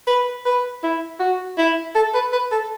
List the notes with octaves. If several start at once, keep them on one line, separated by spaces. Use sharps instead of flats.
B4
B4
E4
F#4
E4
A4
B4
B4
A4